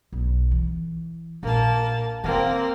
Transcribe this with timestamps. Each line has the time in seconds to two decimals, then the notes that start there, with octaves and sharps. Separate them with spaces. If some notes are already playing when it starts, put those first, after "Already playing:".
0.12 B1
0.51 E3
1.43 A#1 A#3 A5
2.24 D#3 A#3 C4 F4